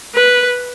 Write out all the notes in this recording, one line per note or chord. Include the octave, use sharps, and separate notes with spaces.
B4